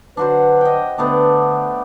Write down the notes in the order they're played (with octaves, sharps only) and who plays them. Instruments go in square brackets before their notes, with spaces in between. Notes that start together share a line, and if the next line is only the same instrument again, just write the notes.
[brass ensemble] D3 F#3 B4 [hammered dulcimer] D4 F#4 C5
[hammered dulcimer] D#5 G5
[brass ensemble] D3 [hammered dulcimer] A3 B3 D4